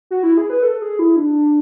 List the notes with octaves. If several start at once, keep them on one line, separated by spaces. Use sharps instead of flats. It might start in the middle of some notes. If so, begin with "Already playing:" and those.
F#4
E4
G#4
B4
A4
G#4
E4
D4